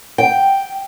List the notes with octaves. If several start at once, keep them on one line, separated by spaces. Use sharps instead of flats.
G5